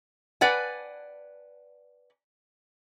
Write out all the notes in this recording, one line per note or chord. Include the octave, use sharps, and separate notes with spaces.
B4 D5 F#5 G#5